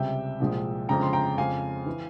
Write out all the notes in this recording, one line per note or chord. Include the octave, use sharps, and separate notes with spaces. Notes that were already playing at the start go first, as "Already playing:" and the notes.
Already playing: C#2 C3 G3 E5 G5
C2 A#2 F3 G#3
G1 F2 C#3 F3 G#3 G5 A#5
C6
G5 A#5
F2 C#3 F3 G#3 F5 G#5
E3